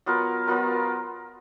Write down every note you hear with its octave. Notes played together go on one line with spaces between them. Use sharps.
F#3 B3 F4 A#4
F#3 B3 F4 A#4